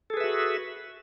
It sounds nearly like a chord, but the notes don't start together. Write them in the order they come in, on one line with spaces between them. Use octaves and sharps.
A4 G#4 B4 E5 F#4